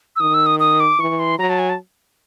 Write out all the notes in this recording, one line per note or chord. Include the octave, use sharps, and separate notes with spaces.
E6
D#3 D#6
E6
D#6
D#6
D6
E3 C#6
C6
F#3 A#5
A5
G#5
A5